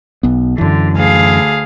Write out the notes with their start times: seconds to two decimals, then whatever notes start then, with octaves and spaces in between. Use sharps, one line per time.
0.23 B1 B3
0.58 F#2 D3 E3
0.95 D2 G#4 F5